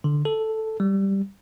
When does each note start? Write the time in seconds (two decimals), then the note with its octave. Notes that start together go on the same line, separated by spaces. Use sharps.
0.04 D3
0.25 A4
0.80 G3